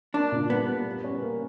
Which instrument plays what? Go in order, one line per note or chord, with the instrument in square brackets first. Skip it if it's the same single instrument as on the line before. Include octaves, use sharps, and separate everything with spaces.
[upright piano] A#3 [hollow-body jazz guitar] D4
[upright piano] A#2
[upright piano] G3 [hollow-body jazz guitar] B3
[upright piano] G3
A#3
C#4
A#3